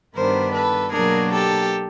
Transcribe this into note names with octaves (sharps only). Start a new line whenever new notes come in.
G2 D#3 G3 B3 D4 A#4 C5
A4 B4
B2 F#3 A#3 D4 G#4 A#4
G4 A4